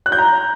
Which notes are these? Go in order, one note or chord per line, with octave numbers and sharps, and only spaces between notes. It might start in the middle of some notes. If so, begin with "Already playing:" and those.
F#6
G6
A#5